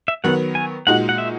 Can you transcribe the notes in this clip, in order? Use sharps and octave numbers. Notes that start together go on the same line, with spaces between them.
E5
D#3 F#3 B3 F#5
G#5
A#2 G#3 D#4 F#4 F#5
F#5
E5